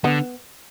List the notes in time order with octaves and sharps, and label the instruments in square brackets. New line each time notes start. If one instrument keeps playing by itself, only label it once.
[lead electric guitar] D3 [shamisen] B3